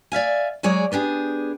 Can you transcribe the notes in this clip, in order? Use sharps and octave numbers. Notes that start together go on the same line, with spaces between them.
D5 E5 F5 G#5
F#3 G#3 G#4 C#5 D5
B3 D4 G4 G#4